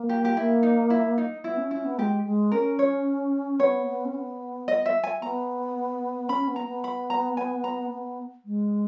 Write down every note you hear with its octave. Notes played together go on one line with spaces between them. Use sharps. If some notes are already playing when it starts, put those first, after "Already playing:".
Already playing: A#3
G4
G4
A#3 E4
D#4
E4
D#4
B3 E4
C#4
C#4 E4
B3
G#3 G4
G#3
C#4 A#4
C#5
B3 C#5
B3
C#4
B3
D#5
E5
G#5
B3 A#5
C#4 B5
B3
A#5
B3
B5
A#5
G#5
A#5
B3
G#3